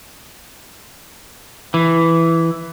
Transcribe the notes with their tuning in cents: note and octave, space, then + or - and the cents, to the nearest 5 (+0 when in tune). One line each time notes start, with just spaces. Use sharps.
E3 +5